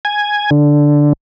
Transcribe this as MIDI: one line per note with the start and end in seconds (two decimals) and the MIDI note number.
0.05 0.50 80
0.51 1.13 50